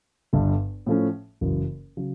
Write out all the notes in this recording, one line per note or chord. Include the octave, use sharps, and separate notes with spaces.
G1 G2 D3
A2 F3 A3 C#4
F#1 F#2 C#3 E3
C#3 F#3